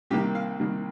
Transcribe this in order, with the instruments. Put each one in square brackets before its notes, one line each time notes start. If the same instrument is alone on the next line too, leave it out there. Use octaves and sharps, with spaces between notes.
[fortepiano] C2 C3 D#3 A#3 G4
F5
C2 C3 D#3 A#3